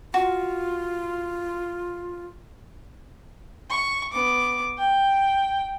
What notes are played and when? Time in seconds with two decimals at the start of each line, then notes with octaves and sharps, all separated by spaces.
0.14 F4 F#4
3.70 C#6
4.12 B3 D6
4.78 G5